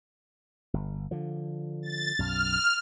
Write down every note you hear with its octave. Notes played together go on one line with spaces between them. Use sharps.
G1
D3 F3
A6
B1 F#2 F6